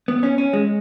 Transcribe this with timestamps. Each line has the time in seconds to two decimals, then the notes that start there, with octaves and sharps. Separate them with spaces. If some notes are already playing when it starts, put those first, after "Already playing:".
0.08 B3
0.23 C#4
0.38 C#4
0.53 G#3